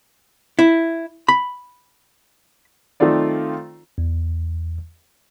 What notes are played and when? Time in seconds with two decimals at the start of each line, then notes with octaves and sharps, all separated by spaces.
0.59 E4
1.28 B5
3.00 D#3 A3 C4 F4 D5
3.98 E2